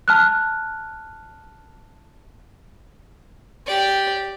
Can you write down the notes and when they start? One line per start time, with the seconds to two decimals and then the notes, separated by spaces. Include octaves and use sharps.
0.08 A5 F6 F#6
3.67 G4 D5